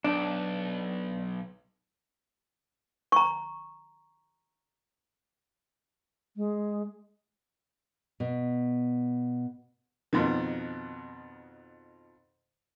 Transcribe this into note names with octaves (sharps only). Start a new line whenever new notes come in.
B1 D4
A#5 C#6
G#3
B2
F2 B2 D#3